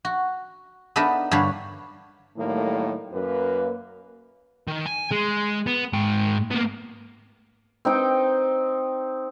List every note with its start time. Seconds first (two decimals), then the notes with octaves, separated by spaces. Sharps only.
0.05 F#4
0.96 B3 D4 D#4 A4 A#4 E5
1.31 G2 D3 D4 C#5 F5 B5
2.38 A2 D#3 F#3 G3 A3 A#3
3.13 F#2 A#3 B4
4.67 D#3
4.85 G#5
5.11 G#3
5.66 B3
5.93 G#2 G5
6.51 A#3 B3
7.85 C4 D#4 G5